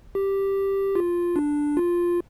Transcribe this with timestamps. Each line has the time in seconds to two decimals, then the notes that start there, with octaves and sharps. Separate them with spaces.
0.15 G4
0.95 F4
1.36 D4
1.77 F4